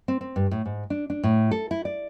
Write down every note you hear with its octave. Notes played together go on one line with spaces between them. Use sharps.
C4
C4
G2
A2
G#2
D4
D4
A2
A4
E4
D5